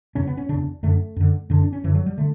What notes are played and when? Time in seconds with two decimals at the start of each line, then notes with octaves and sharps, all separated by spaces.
0.15 E2 C#3 C#4
0.27 B3
0.37 C#4
0.49 E2 C#3 D4
0.83 F#2 D3 A3
1.16 F#2 D3
1.50 F#2 D3 D4
1.62 D4
1.73 C#4
1.84 F#2 D3 E3
1.95 F#3
2.06 G3
2.18 D3 A3